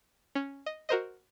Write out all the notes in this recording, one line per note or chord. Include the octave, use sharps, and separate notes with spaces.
C#4
D#5
F#4 A#4 C5 D#5